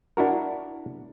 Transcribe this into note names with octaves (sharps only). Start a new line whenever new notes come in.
D4 E4 F#4 A#4